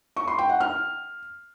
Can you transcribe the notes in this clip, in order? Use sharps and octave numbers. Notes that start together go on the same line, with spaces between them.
C#6
C6
G5
F#5
F6